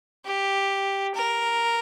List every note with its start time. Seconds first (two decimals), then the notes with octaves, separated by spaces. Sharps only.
0.25 G4
1.15 A#4